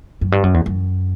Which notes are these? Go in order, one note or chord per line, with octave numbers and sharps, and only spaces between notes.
F#2
G2
F#2
E2
F#2